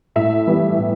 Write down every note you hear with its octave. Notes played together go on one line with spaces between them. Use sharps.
A2 E5
E3 G3 B3 E4
A2